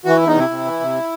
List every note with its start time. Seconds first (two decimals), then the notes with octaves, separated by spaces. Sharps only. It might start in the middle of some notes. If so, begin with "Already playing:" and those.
0.05 E3 F#4
0.16 E2 E4
0.28 D#4
0.35 C3 E4
0.50 C3
0.65 E3
0.80 C3